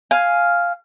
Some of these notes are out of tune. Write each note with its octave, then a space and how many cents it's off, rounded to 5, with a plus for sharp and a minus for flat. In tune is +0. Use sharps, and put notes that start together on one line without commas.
F5 +0 G#5 +0